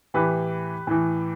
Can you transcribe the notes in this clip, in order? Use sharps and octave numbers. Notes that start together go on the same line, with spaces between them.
A2 E3 G4 B4
A2 E3